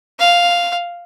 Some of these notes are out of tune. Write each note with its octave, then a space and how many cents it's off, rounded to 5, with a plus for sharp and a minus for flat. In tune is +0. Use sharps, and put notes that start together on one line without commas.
F5 +0